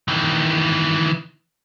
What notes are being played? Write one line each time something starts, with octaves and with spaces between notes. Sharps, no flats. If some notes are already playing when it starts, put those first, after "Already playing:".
D#3 E3